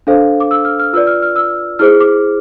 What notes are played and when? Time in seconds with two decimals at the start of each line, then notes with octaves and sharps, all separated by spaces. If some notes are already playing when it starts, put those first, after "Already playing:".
0.07 D4 A4 C5 F5
0.40 D6
0.51 E6
0.65 F6
0.79 F6
0.93 F4 B4 D5 E6
1.07 F6
1.22 F6
1.36 E6
1.79 E4 G#4 C5 F6
2.00 D6